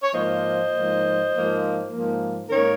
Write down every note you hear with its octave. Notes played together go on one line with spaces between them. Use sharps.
C#5
G#2 F3 A#3 C5 D#5
G#2 F3 A#3
G#2 F3 A#3
G#2 F3 A#3
G#2 D#3 A#3 A#4 C#5